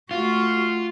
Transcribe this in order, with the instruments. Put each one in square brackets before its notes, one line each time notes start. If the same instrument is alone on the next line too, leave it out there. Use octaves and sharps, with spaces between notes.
[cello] A3 F#4 [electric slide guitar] F4